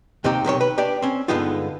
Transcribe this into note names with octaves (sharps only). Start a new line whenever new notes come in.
D#2 C3 C4 D#4 G4
B1 C3 D#3 C#5
B4
D4 G4 D5
C4 C#4
G2 D3 G#3 B3 D#4 F4